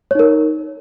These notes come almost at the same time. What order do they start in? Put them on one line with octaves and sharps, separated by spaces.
C#5 D#4 A#4